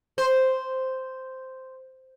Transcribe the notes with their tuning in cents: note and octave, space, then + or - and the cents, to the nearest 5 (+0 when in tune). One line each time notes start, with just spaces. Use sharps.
C5 -5